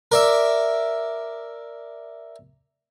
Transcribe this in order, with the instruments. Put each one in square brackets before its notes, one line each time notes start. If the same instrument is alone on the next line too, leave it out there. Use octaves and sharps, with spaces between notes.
[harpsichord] A#4 D5 E5